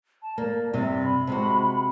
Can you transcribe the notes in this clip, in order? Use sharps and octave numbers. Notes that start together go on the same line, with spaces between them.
A5
A#3 D5
G2 C3 G3
B5
C3 G#3 F#4